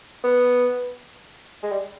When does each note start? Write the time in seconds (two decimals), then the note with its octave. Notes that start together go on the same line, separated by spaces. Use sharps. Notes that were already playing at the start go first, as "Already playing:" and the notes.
0.24 B3
1.63 G#3
1.72 G3